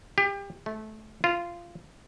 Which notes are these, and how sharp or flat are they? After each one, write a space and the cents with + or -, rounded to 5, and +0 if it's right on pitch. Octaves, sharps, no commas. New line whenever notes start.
G4 +30
A3 -20
F4 -15